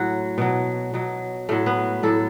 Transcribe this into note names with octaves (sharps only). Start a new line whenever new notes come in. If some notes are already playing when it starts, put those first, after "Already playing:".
Already playing: A2 F#3 F#4
B2 F#3
B2 F#3
A2 F#3 A3
B3
A2 F#3 A4